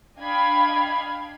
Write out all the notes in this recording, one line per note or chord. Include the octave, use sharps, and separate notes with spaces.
D4 D#5 F5 G5 B5 G#6